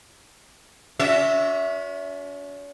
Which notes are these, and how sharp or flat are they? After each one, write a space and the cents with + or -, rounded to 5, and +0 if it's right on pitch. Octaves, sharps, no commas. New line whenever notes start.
C#4 +45 F#4 -25 E5 -5